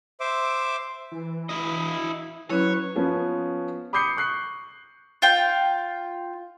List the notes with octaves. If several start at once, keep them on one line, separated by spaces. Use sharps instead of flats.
C5 E5 D6
E3
E4 D#5
F#3 C#4 E4 B4 C#5
F3 B3 C#4
B5 D6 D#6 G6 C7 C#7
C#6 F#6 C7
F4 G5